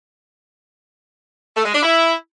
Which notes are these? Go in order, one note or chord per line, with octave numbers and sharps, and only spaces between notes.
A3
G#3
D4
E4